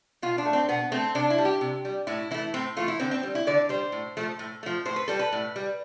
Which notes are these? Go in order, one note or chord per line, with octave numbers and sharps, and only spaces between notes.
B2 F4
D4
A3
C4
B2 B3
A3 C4
C3 D4
E4
G3
G4
C3
G3
A2 E4
E3 A3 E4
A2 C4
E3 A3 F4
E4
D3 C4
C4
G3
E4
D3 D5
G3 C5
A2
F3 A3
A2
F3 A3
A2 C5
B4
G3 A4
B4
A2
G3